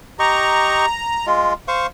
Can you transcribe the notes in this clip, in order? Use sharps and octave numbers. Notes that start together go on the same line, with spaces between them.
G4 D#5 A#5 C#6
G#3 F4
C5 F5 C#6